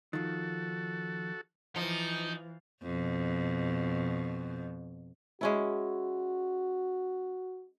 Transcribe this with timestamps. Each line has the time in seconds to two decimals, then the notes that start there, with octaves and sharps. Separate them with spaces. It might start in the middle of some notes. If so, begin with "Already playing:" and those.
0.13 D#3 F3 F#4 A4
1.76 E3 F3 D#4
2.83 F2 B2
5.41 G#3 C#4 E4 F#4